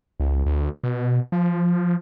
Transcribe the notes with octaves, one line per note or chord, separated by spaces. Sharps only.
C#2
D2
B2
F3